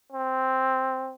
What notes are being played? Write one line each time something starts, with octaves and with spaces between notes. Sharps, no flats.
C4